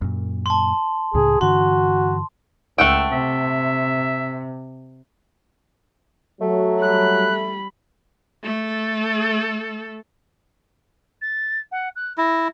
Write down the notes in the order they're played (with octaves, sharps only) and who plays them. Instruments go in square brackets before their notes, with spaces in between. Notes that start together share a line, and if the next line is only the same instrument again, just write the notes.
[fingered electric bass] F#2 A#2
[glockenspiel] A5 C6
[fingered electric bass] C#2 A2 C#3 [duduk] G#4
[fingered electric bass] G2 D3 E3 [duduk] F#4 [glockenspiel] C6
[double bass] C#2 [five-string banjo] A3 F#5 G5 [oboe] E6
[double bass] C3 [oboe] E5
[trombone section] F#3 [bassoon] A3
[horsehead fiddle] G3 B5 [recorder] F#6
[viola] A3 A4
[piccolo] A6
F#5
F#6
[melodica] E4 [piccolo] A#6